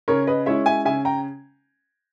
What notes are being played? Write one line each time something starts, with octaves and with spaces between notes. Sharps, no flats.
C#3 A#4 C#5
B4 D#5
G#3 C#4 E4 C#5 E5
E5 G#5
C#3 E5 G#5
G5 A#5